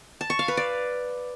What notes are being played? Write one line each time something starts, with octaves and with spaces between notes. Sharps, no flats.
A5
C#6
F5
B4
D5